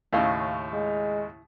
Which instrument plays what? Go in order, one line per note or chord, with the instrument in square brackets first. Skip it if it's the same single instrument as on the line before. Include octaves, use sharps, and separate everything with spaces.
[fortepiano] D#2 A2 C#3 [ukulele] E4 D#5 F5
[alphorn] G#3